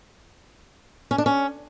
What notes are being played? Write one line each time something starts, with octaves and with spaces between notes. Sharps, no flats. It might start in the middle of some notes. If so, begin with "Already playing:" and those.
C#4
D4
C#4